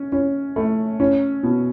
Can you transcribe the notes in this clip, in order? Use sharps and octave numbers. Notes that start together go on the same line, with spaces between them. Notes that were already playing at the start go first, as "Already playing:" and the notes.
Already playing: C#4
C#4
A3
C#4
B2